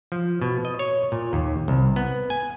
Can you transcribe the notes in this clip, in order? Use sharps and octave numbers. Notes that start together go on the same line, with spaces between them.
F3
B2
D#5
C#5
A#2
D#2
C2
B3
G#5